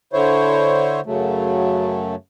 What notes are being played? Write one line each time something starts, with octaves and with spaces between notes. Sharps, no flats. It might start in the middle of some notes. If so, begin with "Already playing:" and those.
D3 E4 C5 C#5
F#2 C#3 F#3 A3